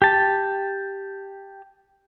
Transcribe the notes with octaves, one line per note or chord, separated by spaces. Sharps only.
G4 A5